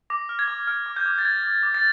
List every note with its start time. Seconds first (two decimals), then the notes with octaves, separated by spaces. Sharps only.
0.10 D6 A#6
0.29 F6
0.39 G#6
0.48 D6
0.67 F6
0.86 D6
0.96 G6
1.06 D6
1.18 A6
1.24 D6 G#6
1.44 D6
1.63 D6
1.75 A6